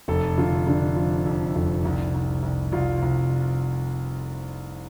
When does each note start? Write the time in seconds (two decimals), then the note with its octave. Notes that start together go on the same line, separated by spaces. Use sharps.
0.08 F1 A4
0.38 D3 F4
0.67 D3 D4
0.96 F3
1.26 F2
1.55 F1
1.85 C2
2.14 C2
2.43 C2
2.72 C2 F4
3.02 C2